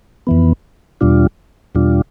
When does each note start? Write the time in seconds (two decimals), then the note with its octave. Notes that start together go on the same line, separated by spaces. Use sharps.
0.27 F2 E3 B3
1.01 E2 B2 G3 D4 F4
1.75 E2 B2 G3 D4 F4